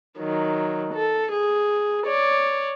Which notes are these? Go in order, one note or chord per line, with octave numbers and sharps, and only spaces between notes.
D#3 F#3
A4
G#4
C#5 D5